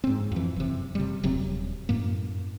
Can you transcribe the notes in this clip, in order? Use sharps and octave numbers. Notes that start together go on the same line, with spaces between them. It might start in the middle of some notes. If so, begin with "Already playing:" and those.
G#2 C4
F2 E3
F#1 C3
C3 G3
D#1 C3 F#3 C4
F#2 A2 A#3